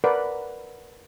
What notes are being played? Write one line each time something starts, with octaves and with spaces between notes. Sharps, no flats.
A#4 B4 D5 F#5